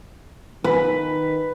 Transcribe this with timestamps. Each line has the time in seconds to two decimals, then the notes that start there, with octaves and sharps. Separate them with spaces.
0.64 D#3 B4